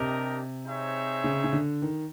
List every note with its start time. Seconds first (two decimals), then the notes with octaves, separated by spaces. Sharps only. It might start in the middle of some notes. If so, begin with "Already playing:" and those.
Already playing: C3 D4 G4 A#4 D#5
0.66 C4 D#4 G#4 C#5 E5
1.24 C#3
1.44 C#3
1.53 D3
1.82 D#3